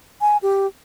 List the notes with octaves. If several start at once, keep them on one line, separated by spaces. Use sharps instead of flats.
G#5
G4